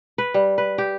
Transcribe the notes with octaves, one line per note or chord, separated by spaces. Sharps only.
B4
G3
B4
G4